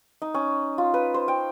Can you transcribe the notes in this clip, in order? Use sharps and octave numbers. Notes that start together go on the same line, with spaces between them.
D#4
C#4
F4
B4
C5
G5